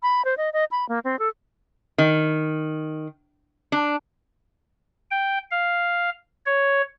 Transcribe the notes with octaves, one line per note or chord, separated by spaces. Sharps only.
B5
C5
D#5
D#5
B5
A#3
C4
A4
D#3
D4
G5
F5
C#5